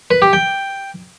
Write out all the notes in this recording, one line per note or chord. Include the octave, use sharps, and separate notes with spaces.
B4
G4
G5